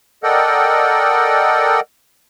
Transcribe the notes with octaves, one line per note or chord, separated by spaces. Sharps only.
A4 A#4 D5 D#5 F#5 G5